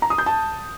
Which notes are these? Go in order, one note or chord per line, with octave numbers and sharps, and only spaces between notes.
A#5
D#6
G6
A5